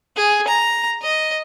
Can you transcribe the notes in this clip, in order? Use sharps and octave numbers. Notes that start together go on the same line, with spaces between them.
G#4
A#5
D#5